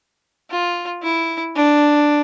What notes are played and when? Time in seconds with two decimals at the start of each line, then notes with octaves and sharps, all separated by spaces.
0.50 F4
1.03 E4
1.56 D4